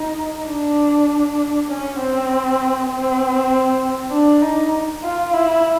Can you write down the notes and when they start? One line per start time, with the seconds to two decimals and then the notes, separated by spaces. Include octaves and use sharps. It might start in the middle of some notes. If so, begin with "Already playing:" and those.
Already playing: D#4
0.48 D4
1.69 C#4
2.00 C4
2.90 C4
4.11 D4
4.42 D#4
5.03 F4
5.34 E4